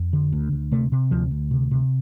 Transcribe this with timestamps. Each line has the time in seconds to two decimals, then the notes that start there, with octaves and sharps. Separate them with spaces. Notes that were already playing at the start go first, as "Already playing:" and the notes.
Already playing: F2
0.13 D3
0.32 D2
0.52 D2
0.72 C3 A3
0.92 C3
1.11 D2 F3
1.31 D2
1.51 C3
1.71 C3